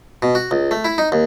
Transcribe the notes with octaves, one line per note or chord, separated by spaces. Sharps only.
B2
F#4
C#2
A3
E4
D#4
D#2